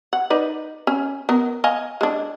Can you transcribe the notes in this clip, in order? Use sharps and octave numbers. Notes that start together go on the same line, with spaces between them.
F#5
D#4 B4 D5
C#4
B3 A#4
D#5 F5 G#5
G#3 D4